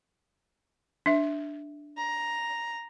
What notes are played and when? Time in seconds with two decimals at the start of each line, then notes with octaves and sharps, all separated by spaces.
1.06 D4 E5
1.97 A#5